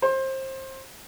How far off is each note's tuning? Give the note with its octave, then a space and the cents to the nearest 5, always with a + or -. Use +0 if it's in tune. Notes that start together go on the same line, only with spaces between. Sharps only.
C5 +25